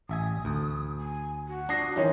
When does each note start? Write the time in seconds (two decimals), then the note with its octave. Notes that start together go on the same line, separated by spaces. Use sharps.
0.09 A1 E5 G#5 D#6
0.45 D2
0.99 G#5
1.48 F#4
1.69 D4 D#6 A#6 C7
1.96 D#3 E3 C#4 D#4 C5 C#5